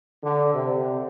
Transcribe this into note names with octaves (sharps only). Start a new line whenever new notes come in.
D3
C3